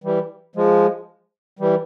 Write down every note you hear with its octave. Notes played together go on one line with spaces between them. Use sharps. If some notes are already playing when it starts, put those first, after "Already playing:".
E3 G3
F3 G#3
E3 G3